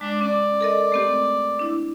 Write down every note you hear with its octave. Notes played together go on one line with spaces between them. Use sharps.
G#3 D4
C#4 D5
A4 A#4 D#5
A3 C4 G4
D4 E4